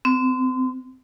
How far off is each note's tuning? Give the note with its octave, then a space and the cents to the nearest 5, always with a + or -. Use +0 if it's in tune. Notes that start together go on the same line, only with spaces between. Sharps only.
C4 -30